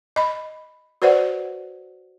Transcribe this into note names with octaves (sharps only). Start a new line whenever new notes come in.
D#5 B5
F#4 B4 C5 D5 F#5